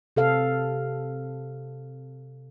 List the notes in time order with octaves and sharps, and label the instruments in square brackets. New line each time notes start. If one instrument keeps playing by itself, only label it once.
[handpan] C3 A4 F5